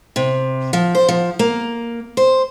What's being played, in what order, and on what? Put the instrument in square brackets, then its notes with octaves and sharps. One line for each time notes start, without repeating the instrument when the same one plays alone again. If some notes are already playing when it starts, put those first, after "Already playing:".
[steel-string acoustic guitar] C3
F3
C5
F3
A#3
C5